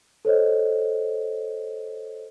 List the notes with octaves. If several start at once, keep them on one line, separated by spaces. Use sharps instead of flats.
A4 C5 C#5 D#5